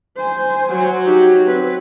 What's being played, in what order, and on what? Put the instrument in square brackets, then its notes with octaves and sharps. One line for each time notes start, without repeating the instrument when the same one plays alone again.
[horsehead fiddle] C5 G#5
[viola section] F#3
[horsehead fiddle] D#4 G4
C4 B4